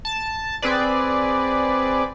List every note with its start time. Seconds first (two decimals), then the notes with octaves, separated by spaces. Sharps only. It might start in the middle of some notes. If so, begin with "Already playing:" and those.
0.05 A5
0.62 C4 G#4 B4 D5